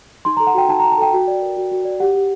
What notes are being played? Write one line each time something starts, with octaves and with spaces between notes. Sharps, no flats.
D#4 C6
A4 A#5
F#5
F#4 G5
D#4 A5
D#4 A#5
A5
A4 G5
F#4
D5
A#4
F#4
F#4
D5
G4 F#5
G4